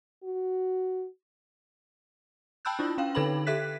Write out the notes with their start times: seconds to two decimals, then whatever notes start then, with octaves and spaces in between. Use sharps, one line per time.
0.24 F#4
2.65 G5 A5 B5 E6 F#6 G6
2.79 D4 E4 F4
2.98 C#4 F5 G5
3.15 D3 D#4 A4 B4 B5 F#7
3.47 G4 A4 E5 F#6 B6